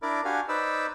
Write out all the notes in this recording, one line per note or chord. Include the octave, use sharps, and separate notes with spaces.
D4 E4 A#4 D5
D4 F#4 G4 F5 G#5
D#4 B4 C5 D5 E6